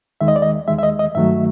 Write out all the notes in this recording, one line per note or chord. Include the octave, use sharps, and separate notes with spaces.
D#2 D#3 G#3 E5
D#5
D5
D#5
D#2 D#3 G#3 E5
E5
D#5
D#5
G2 D#3 F#3 A3 E5